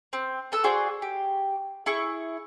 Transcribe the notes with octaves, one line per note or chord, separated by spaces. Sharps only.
C4
B3 A4 E6
F#4 G#4 C5 D5
G4
E4 G#4 C#6